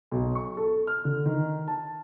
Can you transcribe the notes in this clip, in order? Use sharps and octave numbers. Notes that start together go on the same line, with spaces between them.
B1
C#6
A4
F6
D3
D#3
A5